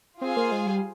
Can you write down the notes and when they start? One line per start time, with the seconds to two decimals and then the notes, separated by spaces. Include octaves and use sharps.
0.21 C4 F4 G#4 C5 F5 G#5
0.37 A#3
0.52 G#3
0.66 G3